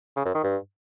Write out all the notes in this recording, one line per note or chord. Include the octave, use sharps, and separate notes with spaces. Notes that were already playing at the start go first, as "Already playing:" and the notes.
C#3
F#2
D#3
G2